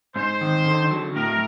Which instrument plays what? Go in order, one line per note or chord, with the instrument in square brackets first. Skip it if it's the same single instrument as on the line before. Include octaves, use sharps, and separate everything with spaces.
[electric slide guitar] G#2 [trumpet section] C5
[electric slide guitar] D#3
D3
F#3
[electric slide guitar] A2 [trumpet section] A#4